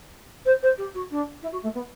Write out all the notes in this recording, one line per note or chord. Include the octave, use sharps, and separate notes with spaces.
C5
C5
G4
F#4
D4
E4
F#4
A3
B3